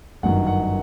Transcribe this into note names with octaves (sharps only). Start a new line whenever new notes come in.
G1 F#2 D#3 F#5
F#5